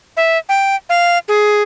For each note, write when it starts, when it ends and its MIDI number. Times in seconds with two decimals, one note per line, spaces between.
0.17 0.38 76
0.49 0.76 79
0.89 1.18 77
1.28 1.62 68